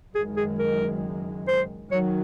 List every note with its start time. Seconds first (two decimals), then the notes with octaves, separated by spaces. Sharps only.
0.15 F#1 F#2 D#3 G#3 G#4
0.37 G#4
0.59 A#4
1.48 C5
1.91 D#3 F#3 C#5